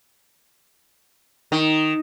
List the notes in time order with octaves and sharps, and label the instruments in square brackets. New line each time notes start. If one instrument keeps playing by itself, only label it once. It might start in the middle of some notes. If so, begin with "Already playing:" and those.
[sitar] D#3